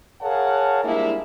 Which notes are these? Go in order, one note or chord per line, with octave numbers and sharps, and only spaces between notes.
G#4 A#4 C#5 F5 F#5 A5
F3 G3 G#3 A#3 D4 E4